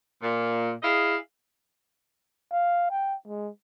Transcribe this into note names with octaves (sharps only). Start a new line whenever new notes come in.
A#2
E4 G#4 D#5 F5
F5
G5
G#3